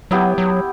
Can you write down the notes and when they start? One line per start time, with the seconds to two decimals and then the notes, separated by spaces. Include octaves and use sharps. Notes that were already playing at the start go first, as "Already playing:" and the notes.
0.11 F#3 B3 E4 G4
0.38 F#3